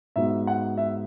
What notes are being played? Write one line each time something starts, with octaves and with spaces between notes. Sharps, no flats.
G#2 F#3 B3 E5
F#5
E5